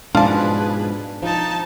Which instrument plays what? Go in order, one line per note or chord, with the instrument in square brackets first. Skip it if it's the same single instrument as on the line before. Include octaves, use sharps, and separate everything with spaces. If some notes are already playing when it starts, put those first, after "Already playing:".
[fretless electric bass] G#2 B2 F3 [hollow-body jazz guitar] D4 [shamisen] F4 A5 [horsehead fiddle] G#4 B4
[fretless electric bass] F3 [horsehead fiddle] D#4 A5